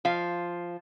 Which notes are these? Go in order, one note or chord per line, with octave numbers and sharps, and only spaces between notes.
F3 F5